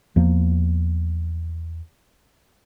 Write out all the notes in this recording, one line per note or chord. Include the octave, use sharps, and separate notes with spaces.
E2 F3 A#3